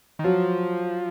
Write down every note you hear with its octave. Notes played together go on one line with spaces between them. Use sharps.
D#3
F3 F#3